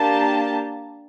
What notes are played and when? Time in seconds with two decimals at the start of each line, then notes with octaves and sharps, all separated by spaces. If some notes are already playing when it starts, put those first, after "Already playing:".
Already playing: A#3 D4 G4 A5